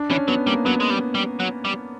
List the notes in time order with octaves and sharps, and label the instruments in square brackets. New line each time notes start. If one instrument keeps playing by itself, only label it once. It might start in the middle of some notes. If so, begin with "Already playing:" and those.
Already playing: [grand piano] D4
[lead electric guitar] E3 [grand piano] C#4
[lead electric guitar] F#3 [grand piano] B3
[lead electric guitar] G3 [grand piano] A#3
[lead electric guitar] F#3 [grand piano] B3
[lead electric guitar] G#3
G3
G3
F#3
G3